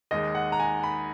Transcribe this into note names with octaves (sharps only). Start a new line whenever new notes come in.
D#2 D#3 G#3 D#5
F#5
A#5
G#5
B5